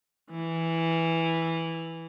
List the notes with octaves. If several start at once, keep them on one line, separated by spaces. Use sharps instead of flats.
E3